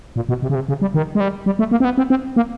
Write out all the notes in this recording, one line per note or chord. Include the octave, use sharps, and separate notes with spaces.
A#2
B2
C3
C#3
C3
C#3
G3
D#3
G#3
G3
G3
A3
A#3
C4
B3
C4
C4
A#3